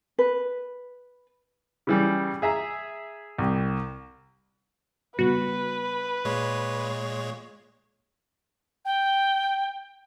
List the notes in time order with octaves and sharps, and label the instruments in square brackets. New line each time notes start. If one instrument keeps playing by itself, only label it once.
[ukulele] B4
[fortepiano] C#3 E3 G3
G#4 E5 A#5
C2 G4
[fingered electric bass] C#3 G3 B3 [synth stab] F#4 [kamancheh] B4
[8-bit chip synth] A#2 G#3 C#5
[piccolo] G5